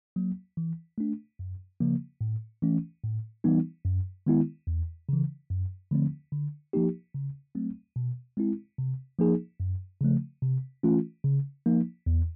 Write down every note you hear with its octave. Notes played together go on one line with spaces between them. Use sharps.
F#3 A#3
E3
A3 D4
F#2
C#3 F3 A#3
A2
E3 A3 C#4
A2
E3 G3 B3 D#4
F#2
D#3 G#3 B3 E4
E2
C#3 E3
F#2
D3 F3 A3 C4
D3
F3 A#3 D#4 G4
C#3
F#3 A3 C4
B2
G#3 C4 E4
C3
F3 A#3 D#4 G#4
F#2
C#3 F3 A3
C3
E3 A3 C#4 F4
C#3
F3 A#3 D#4
E2